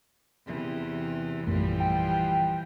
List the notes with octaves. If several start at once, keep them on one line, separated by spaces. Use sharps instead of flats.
E2 C3 E3
A#1 F#2 E3 F3 G3 A3
G5